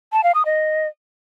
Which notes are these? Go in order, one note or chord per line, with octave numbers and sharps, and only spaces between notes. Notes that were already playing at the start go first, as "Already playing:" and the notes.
A5
F5
D#6
D#5